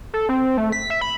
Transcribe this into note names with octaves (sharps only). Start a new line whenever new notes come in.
A4
C4
A3
B6
E5
B5